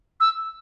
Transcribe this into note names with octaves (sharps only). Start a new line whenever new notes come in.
E6